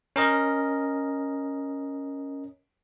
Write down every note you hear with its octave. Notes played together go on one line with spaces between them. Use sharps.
C#4 A#4 D#5